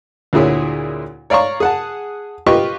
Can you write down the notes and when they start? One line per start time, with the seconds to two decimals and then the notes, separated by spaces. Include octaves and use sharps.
0.33 D2 A#2 E4 G#4 C#5
1.30 C#5 D5 F5 A#5 C#6
1.60 G#4 F#5 A5
2.46 F4 G4 B4 D#5 C#6